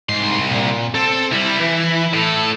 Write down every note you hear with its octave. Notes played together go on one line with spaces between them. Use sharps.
C2 G#2 C6
A#2
C4 A4
C2 G3 E4
E3
A2 A4